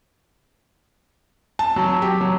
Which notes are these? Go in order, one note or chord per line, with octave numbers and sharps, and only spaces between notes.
A5
F#3
G4
F#3